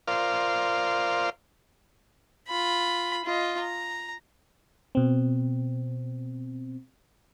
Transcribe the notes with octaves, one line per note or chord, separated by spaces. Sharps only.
F4 A#4 C5 D5 F5
F4 B5
F4 D#5
A#5
B2 C4